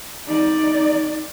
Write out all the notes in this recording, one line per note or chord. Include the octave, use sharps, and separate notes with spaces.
D#4 D5